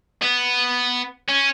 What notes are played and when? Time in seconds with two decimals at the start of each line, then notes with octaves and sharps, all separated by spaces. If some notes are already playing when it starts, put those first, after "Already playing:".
0.22 B3
1.29 C#4